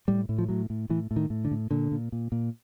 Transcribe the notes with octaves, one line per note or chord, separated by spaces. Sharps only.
A2 G3
A2
F3
A2 F#3
A2
A2 E3
A2
D#3
A2
D3
A2
A#2 D3
A#2
A#2
A#2